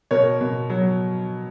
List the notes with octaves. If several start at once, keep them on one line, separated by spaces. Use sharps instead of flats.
B2 A#4 C#5
B2
F#3